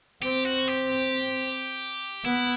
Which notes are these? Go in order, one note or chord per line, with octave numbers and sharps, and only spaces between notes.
C4 G4
F#4
G4
B3 E4